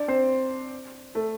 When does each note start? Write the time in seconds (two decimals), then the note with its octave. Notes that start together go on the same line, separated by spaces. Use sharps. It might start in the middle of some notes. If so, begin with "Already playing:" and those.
Already playing: D4 D5
0.08 C4 C5
1.15 A3 A4